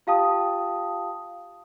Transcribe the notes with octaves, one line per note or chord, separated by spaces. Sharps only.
F4 G4 F5 G5 A5 D#6